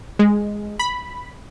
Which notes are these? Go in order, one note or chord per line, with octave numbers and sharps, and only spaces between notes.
G#3
B5